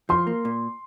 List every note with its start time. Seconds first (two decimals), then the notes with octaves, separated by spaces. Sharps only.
0.09 F3 C6
0.27 A#3
0.45 A#2